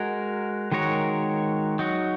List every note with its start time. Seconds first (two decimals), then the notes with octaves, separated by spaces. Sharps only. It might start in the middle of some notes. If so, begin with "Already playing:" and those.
Already playing: G#3 F#4 A#4
0.72 D#3 G#3 F#4 A#4 C#5
1.79 F#3 D#4 F#4